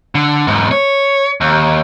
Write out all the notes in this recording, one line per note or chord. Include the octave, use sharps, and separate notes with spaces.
D3
E2 G#2
C#5
D#2